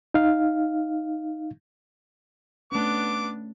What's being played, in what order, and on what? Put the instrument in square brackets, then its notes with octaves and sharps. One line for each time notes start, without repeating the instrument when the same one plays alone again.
[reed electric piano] D#4 F5
[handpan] A3 C#4 [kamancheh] B3 D4 [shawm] D6